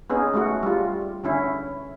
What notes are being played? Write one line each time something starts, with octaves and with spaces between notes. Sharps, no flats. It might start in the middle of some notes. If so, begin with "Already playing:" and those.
B3 C#4 D#4 G#4
G#3 A3 F#4
G3 F4
D3 C#4 E4